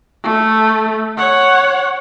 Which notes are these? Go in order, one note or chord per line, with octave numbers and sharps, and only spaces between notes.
A3
C#5 F#5